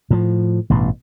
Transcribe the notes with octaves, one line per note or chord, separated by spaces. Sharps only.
A2 F3
A1 G2 B2